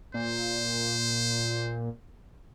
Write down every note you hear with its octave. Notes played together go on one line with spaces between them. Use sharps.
A#2 C5